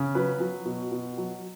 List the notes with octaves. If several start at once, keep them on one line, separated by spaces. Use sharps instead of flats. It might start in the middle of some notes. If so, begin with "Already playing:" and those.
Already playing: C#3
F#3 B4
F#3
B2
B2
F#3